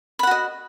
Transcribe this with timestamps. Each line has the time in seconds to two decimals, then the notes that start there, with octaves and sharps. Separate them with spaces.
0.19 B5
0.23 F#5
0.27 F#4
0.31 D#5